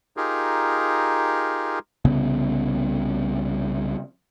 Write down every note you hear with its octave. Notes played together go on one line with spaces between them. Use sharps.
D#4 F4 G4 G#4 A#4
C2 C#3 B3